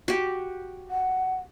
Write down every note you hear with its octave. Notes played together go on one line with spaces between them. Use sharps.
F#4 G4
F#5